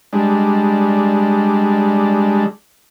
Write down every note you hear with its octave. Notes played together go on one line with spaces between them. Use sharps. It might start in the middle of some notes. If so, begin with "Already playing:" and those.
G3 G#3 D4